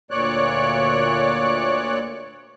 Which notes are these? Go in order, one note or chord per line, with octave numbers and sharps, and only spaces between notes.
D2 A#2 C#5 D5 F#6